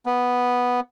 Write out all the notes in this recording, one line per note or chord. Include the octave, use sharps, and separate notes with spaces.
B3